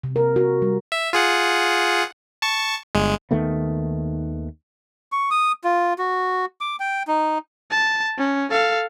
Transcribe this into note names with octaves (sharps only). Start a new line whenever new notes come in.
C3
A#4
F#4
G3
E5
F4 G#4 F#5
A5 C#6
G1 G#3
D#2 D#3 A3 B3
C#6
D#6
F4
F#4
D6
G5
D#4
A5
C#4
A4 F5